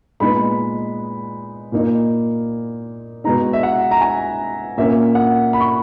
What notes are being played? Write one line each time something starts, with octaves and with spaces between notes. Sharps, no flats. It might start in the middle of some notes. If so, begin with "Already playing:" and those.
A#2 G#3 B3 D#4 B5
A#2 A#3 D#4
B2 G#3 B3 D#4 A#5
E5
F#5
A#5
G#5
A#2 A#3 C#4 E5
F#5
B5
C#6